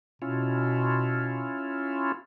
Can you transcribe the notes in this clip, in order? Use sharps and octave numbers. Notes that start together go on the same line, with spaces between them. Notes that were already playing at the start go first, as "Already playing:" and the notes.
B2 C#4 E4 F4